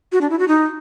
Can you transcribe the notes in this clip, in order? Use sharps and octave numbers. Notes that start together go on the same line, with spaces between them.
F#4
D4
E4
F#4
D#4